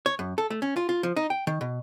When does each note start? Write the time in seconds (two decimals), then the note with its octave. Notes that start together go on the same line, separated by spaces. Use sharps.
0.06 C#5
0.19 F#2
0.38 A4
0.50 A3
0.62 C#4
0.76 F4
0.89 F4
1.03 F3
1.16 D#4
1.30 G5
1.47 D#3
1.61 B2